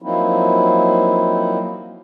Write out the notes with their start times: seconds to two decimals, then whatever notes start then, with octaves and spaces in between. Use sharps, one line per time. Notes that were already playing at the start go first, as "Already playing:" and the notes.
0.02 F3 F#3 A#3 C4 D#4 E4